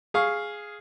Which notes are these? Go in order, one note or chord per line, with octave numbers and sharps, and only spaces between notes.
G#4 F5 C#6